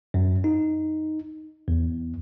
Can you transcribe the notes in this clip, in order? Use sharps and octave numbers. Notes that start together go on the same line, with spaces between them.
F#2
D#4
E2